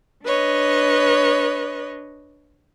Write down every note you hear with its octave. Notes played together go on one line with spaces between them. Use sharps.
D4 B4 C#5 D#5